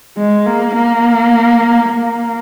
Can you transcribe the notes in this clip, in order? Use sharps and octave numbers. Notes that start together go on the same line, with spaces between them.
G#3
A#3
A#3
A#3